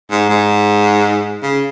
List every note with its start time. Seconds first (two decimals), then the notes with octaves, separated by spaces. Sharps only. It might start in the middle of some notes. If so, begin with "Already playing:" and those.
0.11 G#2
0.29 G#2
1.42 C#3